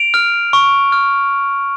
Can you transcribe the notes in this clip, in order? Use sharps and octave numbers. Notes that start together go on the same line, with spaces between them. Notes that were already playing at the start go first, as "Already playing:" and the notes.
Already playing: D7 F7
F6
C#6
F6